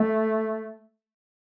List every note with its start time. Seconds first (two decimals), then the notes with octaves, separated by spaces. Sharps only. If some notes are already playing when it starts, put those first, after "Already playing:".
Already playing: A3